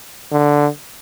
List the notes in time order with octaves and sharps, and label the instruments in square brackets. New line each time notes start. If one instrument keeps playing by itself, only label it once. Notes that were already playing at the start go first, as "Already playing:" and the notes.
[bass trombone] D3